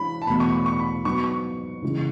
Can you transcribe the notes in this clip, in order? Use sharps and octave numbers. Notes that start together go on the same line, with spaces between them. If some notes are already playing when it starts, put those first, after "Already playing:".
Already playing: E3 G#3 D4 B5
A5
E2 B2 A3 B5
C#6
C#6
C#6
B5
G#2 F#3 B3 C#6
C#6
C#3 E3 G#3